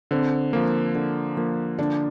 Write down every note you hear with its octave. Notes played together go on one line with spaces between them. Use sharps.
D3 C4
F3 A#3
D3
F3 A#3
D3 D4